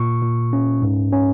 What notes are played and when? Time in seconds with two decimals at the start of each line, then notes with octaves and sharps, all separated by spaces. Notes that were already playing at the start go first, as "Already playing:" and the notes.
Already playing: A#2 C#6
0.23 A#2
0.53 C#4
0.82 G#2
1.13 C#4